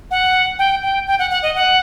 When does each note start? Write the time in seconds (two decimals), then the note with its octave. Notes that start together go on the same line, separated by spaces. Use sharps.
0.11 F#5
0.59 G5
0.82 G5
1.07 G5
1.19 F#5
1.30 F#5
1.43 D#5
1.55 F#5